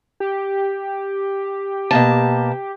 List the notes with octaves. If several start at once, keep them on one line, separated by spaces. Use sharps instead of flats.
G4
B2 A#3 A5